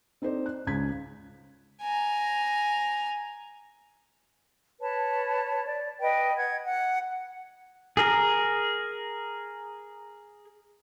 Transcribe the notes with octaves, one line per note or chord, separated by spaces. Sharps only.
C4 D#4 A4 C5 D5
F#6
C#2 C#4 G#6 B6
G#5 A#5
B4 C#5 A5
D5
B4 D#5 G5
F#5 G#6
F#5
G#4 A#4